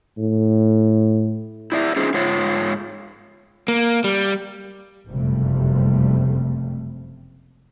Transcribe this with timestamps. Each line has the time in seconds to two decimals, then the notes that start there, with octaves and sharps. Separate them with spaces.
0.18 A2
1.72 E4 D5 E5
1.96 C#4 D#4 F4 G#4 C5
2.14 G#2 F4 C#5
3.68 A#3
4.04 G3
5.09 F#1 F2 C3 G3 A3